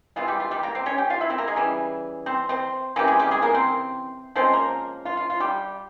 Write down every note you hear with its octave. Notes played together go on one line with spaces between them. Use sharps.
C3 E3 G#3 F4
G3 G4
F4
G3 G4
A#3 A#4
C4 C5
C#4 C#5
G4 G5
F4 F5
E4 E5
C4 C5
A#3 A#4
G#3 G#4
C#3 E3 G3
C4 C5
C4 C5
C3 E3 A#3 C#4 G4
G#3 G#4
G3 G4
G#3 G#4
A#3 A#4
C4 C5
F3 G#3 C4 C#4 C5
A#3 A#4
F4
F4
F4
G3 G4